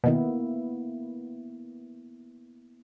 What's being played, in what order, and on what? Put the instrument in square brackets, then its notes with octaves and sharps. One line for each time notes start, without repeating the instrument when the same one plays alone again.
[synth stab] B2 D#3 [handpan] A#3 B3 E4